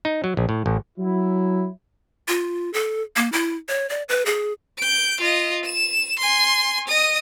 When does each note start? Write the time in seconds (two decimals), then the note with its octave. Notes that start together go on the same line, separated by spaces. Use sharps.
0.05 D#4
0.24 F#3
0.37 A#1
0.49 A2
0.66 A1
0.98 F#3 E4
2.28 F4
2.73 A4
3.16 A#3
3.32 E4
3.68 C#5
3.89 D5
4.09 B4
4.25 G#4
4.78 G6 D7
5.21 F4 D#5
5.65 E7
6.19 G#5 C6
6.87 D#5 D#6